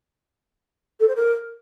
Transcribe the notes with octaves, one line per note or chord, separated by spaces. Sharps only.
A4
C5
A#4